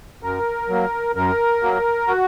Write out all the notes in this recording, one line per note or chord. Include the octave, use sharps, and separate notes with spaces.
F#2 A#4
F#3 A#3
F#2 A#4
F#3 A#3
F#4